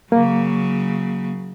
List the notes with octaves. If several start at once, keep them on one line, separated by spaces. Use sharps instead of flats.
C#3 F#3 A#3